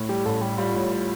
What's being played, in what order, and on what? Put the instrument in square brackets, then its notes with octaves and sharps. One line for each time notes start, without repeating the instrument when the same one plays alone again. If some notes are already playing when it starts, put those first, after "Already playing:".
Already playing: [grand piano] A2
[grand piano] G3 [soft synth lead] G4
[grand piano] A1 [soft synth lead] A4
[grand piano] G3 [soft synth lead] G4
[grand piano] G3 [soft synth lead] F4
[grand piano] A2